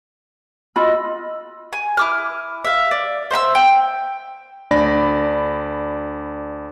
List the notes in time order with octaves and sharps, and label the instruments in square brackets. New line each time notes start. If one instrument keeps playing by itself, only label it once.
[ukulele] F4 B5 [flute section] F#4 D#5 E6
[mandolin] G#5
E4 D6 F6
E5 F5
D5
C5 E5 B5 E6
G5
[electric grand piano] D2 D4 D5 B5 A#6